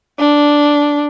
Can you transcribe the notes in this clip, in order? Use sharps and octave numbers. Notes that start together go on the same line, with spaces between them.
D4